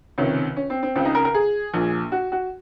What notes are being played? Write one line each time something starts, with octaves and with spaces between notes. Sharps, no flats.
C#2 C3 D#3 C#4
C#4
C4
C4
C#2 C#3 C4
D#4
A#4
A#4
G#4
A#1 A#2
F#4
F#4